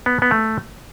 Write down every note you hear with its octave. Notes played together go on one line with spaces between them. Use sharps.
B3
B3
A3